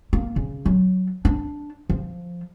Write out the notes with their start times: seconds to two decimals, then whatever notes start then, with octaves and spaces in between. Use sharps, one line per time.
0.13 A#3
0.36 C#3
0.66 F#3
1.25 D4
1.90 F3